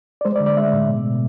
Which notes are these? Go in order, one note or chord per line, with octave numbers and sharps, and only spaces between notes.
D5
G#3 C5
D5
D3
D5
G#3 E5
A2
B2
B2